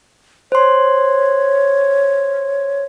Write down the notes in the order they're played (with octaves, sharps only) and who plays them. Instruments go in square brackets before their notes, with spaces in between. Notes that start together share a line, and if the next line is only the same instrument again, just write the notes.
[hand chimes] C5 C6 [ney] C#5